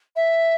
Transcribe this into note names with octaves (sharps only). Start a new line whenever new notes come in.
E5